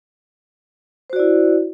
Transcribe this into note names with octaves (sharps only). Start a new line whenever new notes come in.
E4 F#4 C5 D5